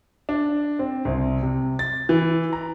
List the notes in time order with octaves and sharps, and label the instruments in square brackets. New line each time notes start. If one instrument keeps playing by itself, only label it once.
[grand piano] D4
C4
C2
C3
A6
E3
A#5